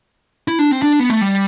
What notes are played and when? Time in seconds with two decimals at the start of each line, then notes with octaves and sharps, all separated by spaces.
0.48 E4
0.59 D4
0.71 C4
0.82 D4
0.99 B3
1.10 A3
1.21 G3